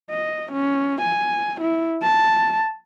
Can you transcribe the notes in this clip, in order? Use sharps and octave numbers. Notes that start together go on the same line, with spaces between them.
D#5
C#4
G#5
E4
A5